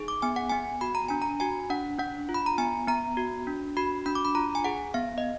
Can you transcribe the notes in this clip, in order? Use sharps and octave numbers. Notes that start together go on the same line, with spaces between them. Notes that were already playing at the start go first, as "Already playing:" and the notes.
Already playing: D#4 G#4
D6
B3 G#5
F#5
B3 G#5
F#4 B5
A#5
D4 G#5
A#5
F#4 G#5
D4 F#5
D4 F#5
F4
B5
A#5
B3 G#5
B3 A#5
F#4
D4
F#4 B5
D4 B5
D6
B5
F4 A#5
G#5
G#4 F#5
B3 F5
D#5